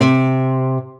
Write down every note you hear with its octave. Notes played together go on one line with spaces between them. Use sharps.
C3